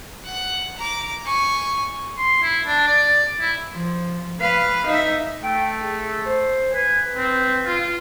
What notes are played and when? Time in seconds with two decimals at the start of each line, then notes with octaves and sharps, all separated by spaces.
0.25 F#5
0.77 A#5 D6
1.25 G#5 C#6
2.18 C6
2.42 E4
2.66 D4
2.87 D5
3.40 E4
3.71 F3
4.40 B4 F5
4.87 D#4 E5
5.43 A3 G5
5.82 G#4
6.25 C5
6.74 B4 G#5
7.16 C4
7.66 F4